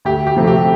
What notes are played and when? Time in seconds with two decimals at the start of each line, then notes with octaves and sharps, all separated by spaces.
0.05 D2 G4
0.27 G4
0.36 C3 F3 A3 C4
0.47 G4